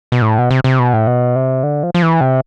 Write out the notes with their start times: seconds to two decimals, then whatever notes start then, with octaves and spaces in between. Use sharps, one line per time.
0.12 B2
0.22 A2
0.38 B2
0.51 C3
0.64 C3
0.79 B2
0.93 A2
1.07 B2
1.35 C3
1.63 D3
1.83 F3
1.94 F3
2.03 E3
2.21 C3